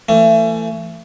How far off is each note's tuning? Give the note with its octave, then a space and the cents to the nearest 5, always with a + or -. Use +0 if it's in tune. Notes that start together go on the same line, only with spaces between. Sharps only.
E3 +35 A3 +30